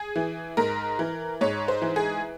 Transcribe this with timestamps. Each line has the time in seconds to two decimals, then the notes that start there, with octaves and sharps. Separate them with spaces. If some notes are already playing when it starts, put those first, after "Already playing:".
Already playing: G#4
0.16 E3
0.57 G#2 A#4
0.99 E3
1.41 G#2 C#5
1.68 C5
1.82 E3
1.96 G#4